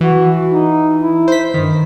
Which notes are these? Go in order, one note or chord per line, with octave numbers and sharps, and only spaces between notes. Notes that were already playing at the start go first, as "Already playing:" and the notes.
E3 F#4
D#4
E4
C5 B6
G2 D#3